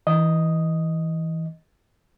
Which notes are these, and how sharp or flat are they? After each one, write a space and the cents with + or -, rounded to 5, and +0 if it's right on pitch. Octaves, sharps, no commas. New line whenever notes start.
E3 -20 D#5 +0